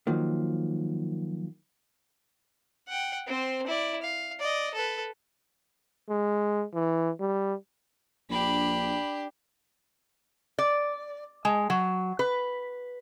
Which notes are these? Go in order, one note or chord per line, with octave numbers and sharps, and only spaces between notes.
D#3 F3 F#3 A#3
F#5 G5
C4 C5
E4 D5
F5
D5 D#5
A4 B4
G#3
E3
G3
A#1 D4 G4 B5
D5
G#3
F#3
B4